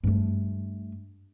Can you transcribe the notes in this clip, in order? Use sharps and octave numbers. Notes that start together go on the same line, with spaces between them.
G2 A3